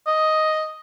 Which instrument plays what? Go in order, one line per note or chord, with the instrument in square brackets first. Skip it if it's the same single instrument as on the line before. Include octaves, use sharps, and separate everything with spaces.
[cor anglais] D#5